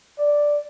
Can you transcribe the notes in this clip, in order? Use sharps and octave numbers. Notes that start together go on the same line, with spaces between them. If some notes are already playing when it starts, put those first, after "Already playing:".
D5